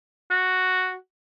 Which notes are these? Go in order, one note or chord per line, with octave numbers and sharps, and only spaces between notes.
F#4